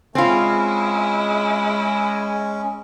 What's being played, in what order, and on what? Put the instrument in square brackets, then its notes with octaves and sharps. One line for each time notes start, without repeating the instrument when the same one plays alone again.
[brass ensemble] G#3 [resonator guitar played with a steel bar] C4 F4 [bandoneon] C#4 [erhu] E4